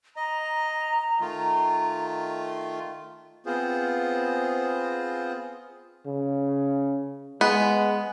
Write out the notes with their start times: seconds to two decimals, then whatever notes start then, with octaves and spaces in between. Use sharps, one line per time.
0.17 D#5 A#5
1.20 D#3 A3 F4
3.46 B3 C4 F4 G#4 C5
6.06 C#3
7.41 G#3 B3